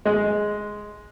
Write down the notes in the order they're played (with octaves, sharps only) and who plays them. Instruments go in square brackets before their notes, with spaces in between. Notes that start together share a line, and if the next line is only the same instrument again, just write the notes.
[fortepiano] G#3